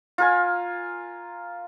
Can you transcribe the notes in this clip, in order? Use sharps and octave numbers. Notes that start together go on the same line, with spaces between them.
F4 A#4 G#5